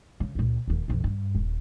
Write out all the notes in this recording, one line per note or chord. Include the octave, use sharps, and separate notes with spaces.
C#3
C#2 A#2
D#1 D#2
B1 F2
G2
D#1